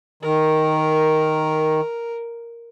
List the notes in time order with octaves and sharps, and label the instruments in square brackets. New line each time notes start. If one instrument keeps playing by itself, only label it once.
[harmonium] D#3 [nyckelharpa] A#4